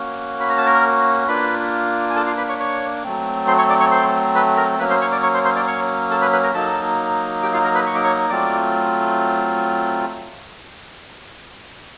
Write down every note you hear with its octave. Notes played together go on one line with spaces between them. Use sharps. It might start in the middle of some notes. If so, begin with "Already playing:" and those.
Already playing: A#3 C#4 F#4
B5
A#5
A5
A#4 A#5
A#3 D4 F4 B4 B5
G#5
A4 A5
F4 F5
B4 B5
C#5 C#6
C#5 C#6
F#3 A3 C4
C5 C6
C#5 C#6
D5 D6
C#5 C#6
C5 C6
B4 B5
A#4 A#5
F#3 A#3 C#4 B4 B5
C5 C6
C#5 C#6
D5 D6
C#5 C#6
C5 C6
C5 C6
D5 D6
C#5 C#6
A4 A5
B4 B5
B4 B5
A#4 A#5
F#3 A#3 D#4 A4 A5
G4 G5
F4 F5
A#4 A#5
B4 B5
C#6
D6
C#5 C#6
F#3 A3 C4 F4 D5 D6